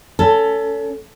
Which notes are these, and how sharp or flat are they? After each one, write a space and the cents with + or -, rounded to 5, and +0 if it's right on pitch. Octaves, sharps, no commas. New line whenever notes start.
C#4 +30 A4 +15